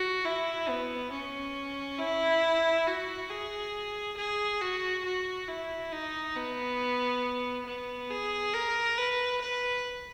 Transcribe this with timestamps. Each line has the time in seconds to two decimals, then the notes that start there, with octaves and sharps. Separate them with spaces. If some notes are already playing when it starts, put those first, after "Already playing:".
Already playing: F#4
0.25 E4
0.69 B3
1.12 C#4
1.99 E4
2.87 F#4
3.30 G#4
4.17 G#4
4.61 F#4
5.05 F#4
5.48 E4
5.92 D#4
6.36 B3
7.66 B3
8.10 G#4
8.54 A#4
8.97 B4
9.41 B4